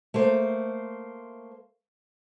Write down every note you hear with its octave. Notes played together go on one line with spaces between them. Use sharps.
A3 A#3 C5